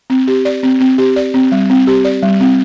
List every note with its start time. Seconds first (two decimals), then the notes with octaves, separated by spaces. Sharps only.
0.10 C4
0.28 G4
0.45 D5
0.63 C4
0.80 C4
0.98 G4
1.16 D5
1.34 C4
1.52 G3
1.70 C4
1.87 G4
2.05 D5
2.22 G3
2.40 C4